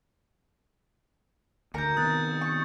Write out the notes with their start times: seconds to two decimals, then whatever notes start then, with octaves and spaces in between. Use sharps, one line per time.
1.74 D2 A#4 A#5 G6 C#7
1.97 C3 D#3 B3 D#6 F#6 A6
2.41 C#6